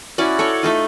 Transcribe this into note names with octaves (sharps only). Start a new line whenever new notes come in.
C#4 E4 F#4 D5
A4 C#5 D5
A3 D#4 F4